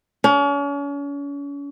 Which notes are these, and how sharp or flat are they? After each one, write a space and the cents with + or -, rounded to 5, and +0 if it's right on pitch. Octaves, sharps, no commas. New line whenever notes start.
C#4 +40